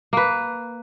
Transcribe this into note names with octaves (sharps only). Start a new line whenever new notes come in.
A#3 B4